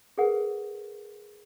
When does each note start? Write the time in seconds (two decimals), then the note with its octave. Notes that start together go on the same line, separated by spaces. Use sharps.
0.18 G#4 A#4 B4 F#5